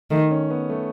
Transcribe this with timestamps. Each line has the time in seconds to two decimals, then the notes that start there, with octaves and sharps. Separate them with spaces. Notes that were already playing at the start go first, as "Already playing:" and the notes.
0.11 D#3 A3
0.31 C#4
0.50 B3
0.70 A3